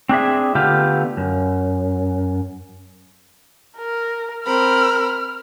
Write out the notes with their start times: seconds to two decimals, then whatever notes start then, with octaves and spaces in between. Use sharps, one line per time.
0.09 C4 D4 G#4 E5
0.55 D3 A3 B3 F4 G4
1.17 F#2
3.78 A#4
4.45 C4 A#4 B5 F6